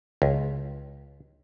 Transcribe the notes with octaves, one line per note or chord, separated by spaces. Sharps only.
C#2